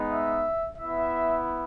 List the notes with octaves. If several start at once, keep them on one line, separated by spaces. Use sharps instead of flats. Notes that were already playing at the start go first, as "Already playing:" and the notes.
Already playing: G#3 B3 D#4
E5
B3 E4 E5